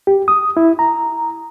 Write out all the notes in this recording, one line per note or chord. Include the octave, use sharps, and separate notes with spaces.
G4
D#6
E4
A#5